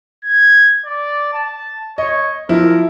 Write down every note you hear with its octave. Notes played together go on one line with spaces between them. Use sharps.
G#6
D5
A5
C#5 D#5
F3 E4 A#4